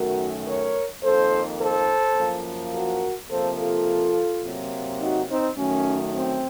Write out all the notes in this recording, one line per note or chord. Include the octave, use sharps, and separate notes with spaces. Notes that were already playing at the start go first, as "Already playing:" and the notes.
Already playing: F#2 D#3 A3 F#4 A#4
A#4 C#5
F2 D#3 A#3 A4 C5
A4 C5
F#2 F3 A#3
F#4 A#4
C3 F3 A#3 A4 C5
F4 A4
C3 F#3 A#3
D#4 F#4
C4 D#4
F#2 D#3 F#3 A3 C#4
C4